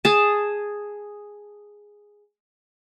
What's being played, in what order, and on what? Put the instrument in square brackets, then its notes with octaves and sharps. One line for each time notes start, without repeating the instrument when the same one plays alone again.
[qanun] G#4 A5